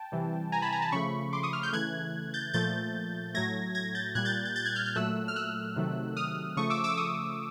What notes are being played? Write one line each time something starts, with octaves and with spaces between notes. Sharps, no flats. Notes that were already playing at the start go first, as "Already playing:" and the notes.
Already playing: G5 A5
C3 E3 G3
G#5 A#5
A5 B5
G#5 A#5
A5 B5
C#3 F3 A3 B5 C#6
C6 D6
C#6 D#6
D#6 F6
F6 G6
C#3 E3 A3 F#6 G#6
G6 A6
A#2 F3 A3 G6 A6
A2 F#3 A3 G#6 A#6
G#6 A#6
G6 A6
A#2 G3 F#6 G#6
G6 A6
G6 A6
G6 A6
F#6 G#6
F6 G6
F6 G6
A#2 F#3 A3 E6 F#6
F6
E6 F#6
C3 D#3 F#3 A3
D#6 F6
C#3 F3 A3 C#6 D#6
D6 E6
D6 E6
C#6 D#6